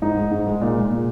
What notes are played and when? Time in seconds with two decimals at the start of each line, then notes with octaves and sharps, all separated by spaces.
0.02 G#2 D#4
0.17 G#3
0.31 G#2
0.47 G#3
0.61 A#2
0.76 G#3
0.91 A#2